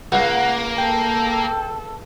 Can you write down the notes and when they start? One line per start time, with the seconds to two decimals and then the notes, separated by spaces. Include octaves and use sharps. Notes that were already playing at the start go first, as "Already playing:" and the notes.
0.12 C#2 A#3 F#5
0.78 A4 G5